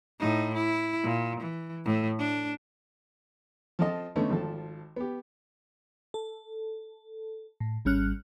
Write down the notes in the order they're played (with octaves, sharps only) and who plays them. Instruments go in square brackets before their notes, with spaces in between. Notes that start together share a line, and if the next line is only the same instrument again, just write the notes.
[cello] A2 D#4
E4
A#2
E3
A2 A3
D4
[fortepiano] F3 C4 F4 A4 D#5
D3 A3 B3 C#4 D#4
G#1 F3 A4
B3 G4
[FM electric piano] A4
A2
G#1 G3 C#4 F6 F#6